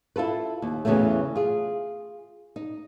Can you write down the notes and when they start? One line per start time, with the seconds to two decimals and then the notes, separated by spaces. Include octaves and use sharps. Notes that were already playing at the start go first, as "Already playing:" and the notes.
0.16 E4 F4 A4 B4
0.62 D#2
0.85 E2 C#3 E3 F#3 A3
1.36 F4 G#4
2.56 D#4